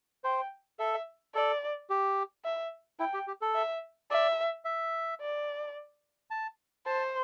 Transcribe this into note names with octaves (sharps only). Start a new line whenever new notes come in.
C5 G5
A4 E5
A4 D5
G4
E5
E4 G5
G4
G4
A4
E5
D5 E5
E5
D5
A5
C5 A5